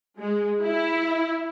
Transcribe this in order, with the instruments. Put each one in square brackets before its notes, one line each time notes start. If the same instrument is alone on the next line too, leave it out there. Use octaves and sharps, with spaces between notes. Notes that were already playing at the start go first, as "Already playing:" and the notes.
[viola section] G#3
E4